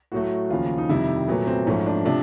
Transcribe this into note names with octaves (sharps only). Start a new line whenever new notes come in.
A2 F#3 A3 F#4
D#2 C#3 F3 F4
D#4
F2 C3 D#3 G3 E4
A#2 F#3 A3 B3
C4
G#2 F3 A3 C#4
D4
C3 F3 A3 D4